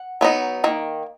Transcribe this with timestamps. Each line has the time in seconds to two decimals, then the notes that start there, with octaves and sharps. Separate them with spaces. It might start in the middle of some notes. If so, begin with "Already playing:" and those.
Already playing: F#5
0.21 F#3 B3 D#4
0.64 D#3 A#3